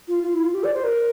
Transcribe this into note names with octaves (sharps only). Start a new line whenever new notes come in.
F4
F4
E4
F4
G4
D5
C5
A#4